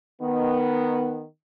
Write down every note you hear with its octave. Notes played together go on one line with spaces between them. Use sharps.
D#3 B3